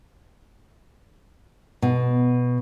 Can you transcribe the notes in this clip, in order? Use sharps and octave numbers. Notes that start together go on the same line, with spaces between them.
B2